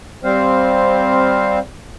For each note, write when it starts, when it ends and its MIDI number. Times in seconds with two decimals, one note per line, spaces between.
0.24 1.59 55
0.24 1.59 60
0.24 1.59 72
0.24 1.59 77